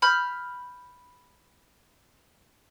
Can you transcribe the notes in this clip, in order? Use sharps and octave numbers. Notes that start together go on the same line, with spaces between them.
B5 F6 G6